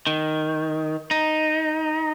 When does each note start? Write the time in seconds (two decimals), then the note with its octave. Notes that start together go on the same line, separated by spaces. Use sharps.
0.07 D#3
1.11 D#4